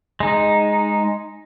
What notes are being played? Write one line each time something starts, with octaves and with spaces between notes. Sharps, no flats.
G#3 D#4